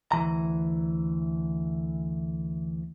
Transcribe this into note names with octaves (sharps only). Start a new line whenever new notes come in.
D2 E3 A#5